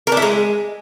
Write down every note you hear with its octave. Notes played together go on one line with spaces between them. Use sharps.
A#4
D4
E4
G#3